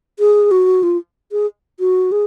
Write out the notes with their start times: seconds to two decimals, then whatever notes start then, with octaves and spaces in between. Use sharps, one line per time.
0.19 G#4
0.51 F#4
0.83 F4
1.32 G#4
1.80 F#4
2.12 G#4